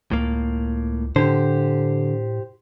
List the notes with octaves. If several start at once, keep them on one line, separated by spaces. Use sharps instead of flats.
C#2 A2 A#3
A2 D3 G4 C5